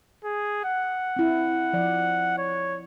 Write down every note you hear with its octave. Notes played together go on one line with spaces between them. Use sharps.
G#4
F#5
C4 E4
F3 D5
C#5